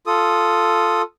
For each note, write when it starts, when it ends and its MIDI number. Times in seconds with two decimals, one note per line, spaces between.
0.07 1.02 65
0.07 1.02 69
0.07 1.02 87